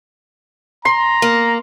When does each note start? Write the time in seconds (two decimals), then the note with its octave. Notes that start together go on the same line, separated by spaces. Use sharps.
0.85 A#5 C6
1.22 A#3